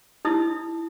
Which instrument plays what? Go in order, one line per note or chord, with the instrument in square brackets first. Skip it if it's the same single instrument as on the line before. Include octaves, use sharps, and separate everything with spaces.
[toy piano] D#4 E4 D#6